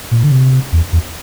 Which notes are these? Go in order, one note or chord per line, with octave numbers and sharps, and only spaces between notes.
A#2
D3
C3
E2
E2